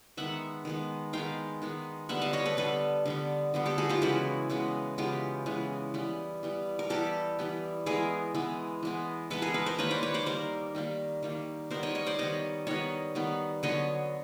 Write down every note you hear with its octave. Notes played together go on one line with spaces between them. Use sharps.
D#3 G#3 B3 E5 F#5
D#3 G#3 B3
D#3 G#3 B3 F5 G5
D#3 G#3 B3
D3 G3 B3 E5 F#5
D#5 F5
C#5 D#5
A4 B4
D3 G3 B3 A4 B4
D3 G3 B3
D3 G3 B3
G4 A4
F#4 G#4
F4 G4
C#3 E3 G#3 B3 E4 F#4
C#3 E3 G#3 B3
C#3 E3 G#3 B3 F4 G4
C#3 E3 G#3 B3
E3 G3 B3
E3 G3 B3
A#4
E3 G3 B3 G4 A4
E3 G3 B3
E3 G#3 B3 G#4 A#4
E3 G#3 B3
E3 G#3 B3
E3 G#3 B3 A4 B4
G#4 A#4
A4 B4
A#4 C5
D#3 G3 A#3 B4 C#5
C5 D5
B4 C#5
C5 D5
D#3 G3 A#3 A#4 C5
D#3 G3 A#3
D#3 G3 A#3
D#3 G3 B3 A#4 C5
C#5 D#5
C#5 D#5
C5 D5
D#3 G3 B3 C#5 D#5
D#3 G3 B3 C#5 D#5
D#3 G3 B3
D3 F#3 B3 C#5 D#5